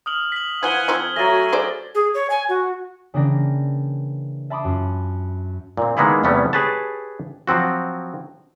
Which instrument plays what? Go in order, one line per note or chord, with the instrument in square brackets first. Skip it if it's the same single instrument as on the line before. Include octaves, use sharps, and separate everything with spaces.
[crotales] D#6 F6 F#7
B6 F#7
[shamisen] E3 F3 [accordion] F#5 G#5 [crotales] G#6 G7
[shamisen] F3 C4 A4
[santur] F#3 A3 [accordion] G#5 [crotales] A6 A#6
[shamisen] G#4 C5 D5 [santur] D6
[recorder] G#4
C#5
G#5
F#4
[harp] C#3 E3 A#3 D4 G5 A#6
E5 A5 B5 C6 D6 D#6
F#2 F4
[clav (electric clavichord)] A#2 C4
D#3 G#3 A#3 B3 E4 G#4
E2 C3 G3 A3 B3 C#4
G4 G#4 B4 C#5 A5
F3 F#3 C4 F#4